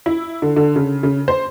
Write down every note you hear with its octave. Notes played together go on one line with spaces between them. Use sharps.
E4
D3
D3
C#3
C#3
C5